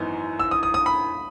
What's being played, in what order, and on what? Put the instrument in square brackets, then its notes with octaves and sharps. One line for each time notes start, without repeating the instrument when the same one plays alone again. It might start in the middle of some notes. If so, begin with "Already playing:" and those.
Already playing: [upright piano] G#1 F#2 E3 B3 D#4
[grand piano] E6
D#6
D#6
D#6
B5